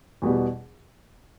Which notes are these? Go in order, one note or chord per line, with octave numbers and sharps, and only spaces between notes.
E2 B2 G3 B3